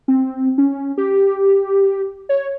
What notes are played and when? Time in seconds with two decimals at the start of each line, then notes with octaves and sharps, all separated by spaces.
0.08 C4
0.58 C#4
0.98 G4
2.29 C#5